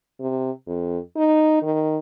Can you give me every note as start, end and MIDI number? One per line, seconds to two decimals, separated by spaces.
0.20 0.51 48
0.67 0.98 41
1.16 1.61 63
1.62 1.99 51